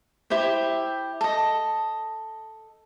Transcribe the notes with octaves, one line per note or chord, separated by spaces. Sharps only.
E4 G4 C5 E5
A4 D#5